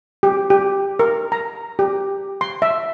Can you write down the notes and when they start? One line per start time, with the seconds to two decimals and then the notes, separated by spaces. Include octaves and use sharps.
0.23 G4
0.50 G4
0.99 A#4
1.32 A#5
1.79 G4
2.41 C6
2.62 E5